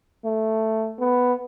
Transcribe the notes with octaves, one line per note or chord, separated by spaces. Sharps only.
A3
B3